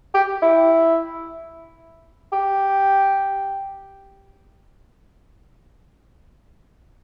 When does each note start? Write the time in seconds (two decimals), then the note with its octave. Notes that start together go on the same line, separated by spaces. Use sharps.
0.14 G4
0.42 E4
2.32 G4